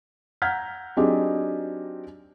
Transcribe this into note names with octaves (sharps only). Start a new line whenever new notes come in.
F#5 A#5 F6 G6 G#6 B6
F#3 C4 D4 D#4 G4 G#4